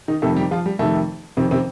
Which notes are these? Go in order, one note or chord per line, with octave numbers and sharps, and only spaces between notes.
D#3 D#4
F2 C3 D#3 A3 A4
G3 G4
F3 F4
G3
F2 C3 D#3 A3
F2 C3 D#3 C4
C3 C4